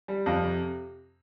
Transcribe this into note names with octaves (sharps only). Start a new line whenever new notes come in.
G3
F2
C3